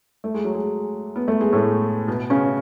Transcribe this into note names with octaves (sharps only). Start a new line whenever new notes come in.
A3
G#3
F#3
G#3
B3
A3
G#3
A2 A3
B2 B3
C#3 C#4